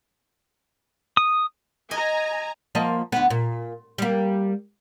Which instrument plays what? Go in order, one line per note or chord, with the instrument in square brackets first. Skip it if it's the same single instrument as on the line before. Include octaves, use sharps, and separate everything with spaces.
[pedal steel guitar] D#6
[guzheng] D#5 [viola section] G#5 A#5
[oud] F3 A#3 D#5
D2 B3
A#2
G3 A#3